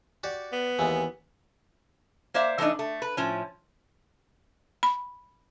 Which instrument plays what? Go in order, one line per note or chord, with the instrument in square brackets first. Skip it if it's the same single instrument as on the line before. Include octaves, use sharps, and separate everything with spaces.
[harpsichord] F#4 G4 D5
[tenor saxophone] B3
[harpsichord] D#2 E3 G#3
[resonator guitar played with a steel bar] A#3 C5 D5 E5 F5
E3 A3 D4 D#4
A3
B4
A2 F3 C#4
[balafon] B5